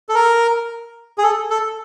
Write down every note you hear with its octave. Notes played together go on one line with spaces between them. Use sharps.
A4
A#4
G#4
A4
A4